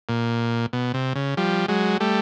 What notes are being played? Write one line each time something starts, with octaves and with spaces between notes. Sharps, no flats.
A#2
B2
C3
C#3
F3 G3
F#3 G#3
G3 A3